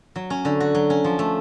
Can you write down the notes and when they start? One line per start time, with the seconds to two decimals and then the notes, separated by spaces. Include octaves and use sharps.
0.16 F#3
0.30 C#4
0.45 D3
0.60 F#4
0.75 F#3
0.90 C#4
1.04 F3
1.19 A3